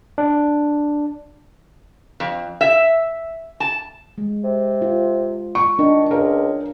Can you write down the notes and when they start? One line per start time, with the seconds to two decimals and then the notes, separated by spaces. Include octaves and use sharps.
0.18 D4
2.20 F2
2.61 E5
3.60 A5
4.18 G#3
4.44 C3
4.82 F4
5.55 C#6
5.79 D#3 D4
6.11 C#2 A#4